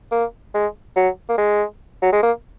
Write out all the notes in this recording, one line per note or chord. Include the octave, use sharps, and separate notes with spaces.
A#3
G#3
F#3
A#3
G#3
F#3
G#3
A#3